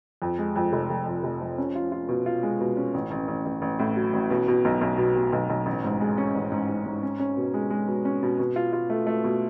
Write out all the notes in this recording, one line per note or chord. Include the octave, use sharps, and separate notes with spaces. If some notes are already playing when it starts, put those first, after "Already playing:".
F2
G#3
F2
F1
F1
F2
F1
F3
C#4
F4
F4
B2
F4
G#3
B2
C#4
A1
A1
A1
A1
A1
A2
F#3
A1
B2
B2
B1
B1
B2
B2
B1
B1
A1
G#2
G#3
C#4
A1
G#2
G#2
G#2
C#4
C#4
B2
G#3
G#3
B2
C#4
B2
B2
F4
F4
A3
A3
B2